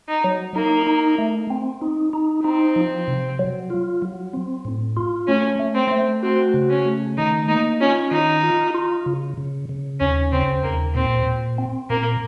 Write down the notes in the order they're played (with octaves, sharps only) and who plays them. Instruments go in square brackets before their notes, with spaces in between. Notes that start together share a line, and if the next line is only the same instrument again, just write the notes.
[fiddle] D#4
[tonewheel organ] F#3
[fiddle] A#3 [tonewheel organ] D#4
[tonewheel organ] D#4
A3
C4
D#4
D#4
[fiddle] C4 [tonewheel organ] D#4
[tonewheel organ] F3
C3
F#3
F4
F#3
C4
A2
F4
[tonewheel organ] A3 [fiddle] C#4
[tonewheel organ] A3
[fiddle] C4
[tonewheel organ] A3
[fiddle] C4 [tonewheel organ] F#4
[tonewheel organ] C#3
[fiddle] C#4
[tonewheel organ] A3
[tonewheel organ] D#3 [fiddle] D#4
[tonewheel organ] A#3 [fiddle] D#4
[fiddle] C#4 [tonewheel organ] F4
[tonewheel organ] D#3 [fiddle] D#4
[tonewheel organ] F4
F4
C#3
C#3
C#3
[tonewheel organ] D#2 [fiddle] C#4
[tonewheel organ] C#3 [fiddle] C4
[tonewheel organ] D#2 [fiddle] A#3
[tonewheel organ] A#2 [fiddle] C4
[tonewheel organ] A#2
C4
[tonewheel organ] A#2 [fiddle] A#3